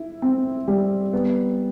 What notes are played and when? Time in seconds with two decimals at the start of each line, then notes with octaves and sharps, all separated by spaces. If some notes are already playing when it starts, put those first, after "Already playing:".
Already playing: E4
0.22 C4
0.68 G3
1.13 B3